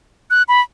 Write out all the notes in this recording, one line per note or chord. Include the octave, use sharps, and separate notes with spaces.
F#6
B5